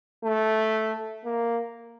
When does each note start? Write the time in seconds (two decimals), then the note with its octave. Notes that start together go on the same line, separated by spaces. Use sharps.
0.24 A3
1.25 A#3